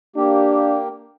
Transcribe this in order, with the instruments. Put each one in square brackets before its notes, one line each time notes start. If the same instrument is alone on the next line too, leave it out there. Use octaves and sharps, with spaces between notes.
[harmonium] A#3 G4 [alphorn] D4